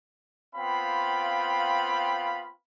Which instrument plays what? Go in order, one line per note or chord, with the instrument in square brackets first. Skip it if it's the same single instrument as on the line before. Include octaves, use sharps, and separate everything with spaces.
[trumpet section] B3 C4 F4 F5 G5 B5